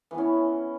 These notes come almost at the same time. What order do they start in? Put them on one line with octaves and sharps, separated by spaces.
E3 B3 C#4